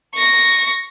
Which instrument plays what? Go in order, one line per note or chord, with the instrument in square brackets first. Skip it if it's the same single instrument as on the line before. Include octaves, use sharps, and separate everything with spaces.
[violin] C#6 A#6